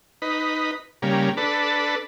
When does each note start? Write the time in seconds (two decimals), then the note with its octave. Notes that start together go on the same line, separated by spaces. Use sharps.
0.22 D#4 B4
1.02 C#3 G3 A#3
1.37 D4 A4 B4